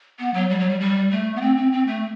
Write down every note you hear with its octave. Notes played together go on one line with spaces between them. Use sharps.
B3
F#3
G3
F#3
G3
G3
A3
B3
C4
C4
C4
A3